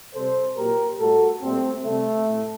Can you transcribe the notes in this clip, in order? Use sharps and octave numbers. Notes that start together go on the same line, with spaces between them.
C3 G3 A4 C5
A#2 F#3 G4 A#4
A2 G3 F#4 A4
A#2 G3 A3 C4
C3 G3 A3
A2